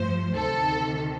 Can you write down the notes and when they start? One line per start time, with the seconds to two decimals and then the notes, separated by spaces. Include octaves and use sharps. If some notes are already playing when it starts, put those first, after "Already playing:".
Already playing: G2 F3 A3 C5
0.35 D2 C3 D#3 A4